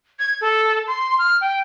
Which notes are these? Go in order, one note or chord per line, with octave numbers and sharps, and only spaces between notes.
G#6
A4
C6
F6
G5